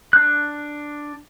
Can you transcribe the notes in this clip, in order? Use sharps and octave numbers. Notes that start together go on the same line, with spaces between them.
D4 F#6